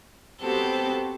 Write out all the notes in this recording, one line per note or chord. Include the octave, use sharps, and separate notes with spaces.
B3 C4 F#4 G4 A4 C5